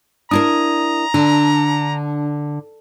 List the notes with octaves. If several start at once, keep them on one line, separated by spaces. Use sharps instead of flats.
D4 E4 A#4 A#5 D#6
D3 D4